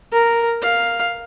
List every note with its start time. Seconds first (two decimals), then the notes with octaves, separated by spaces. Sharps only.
0.13 A#4
0.62 F5